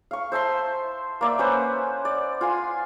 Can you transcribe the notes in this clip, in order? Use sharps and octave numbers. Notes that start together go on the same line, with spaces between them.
F5 C#6
C5 E5 A5 C6
A#3 D5 E5
C#4 B4 C5 F#5
D5
F4 G#5 C6